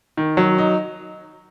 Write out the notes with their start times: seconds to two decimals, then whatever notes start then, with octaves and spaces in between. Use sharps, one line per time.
0.17 D#3
0.37 F#3
0.58 D#4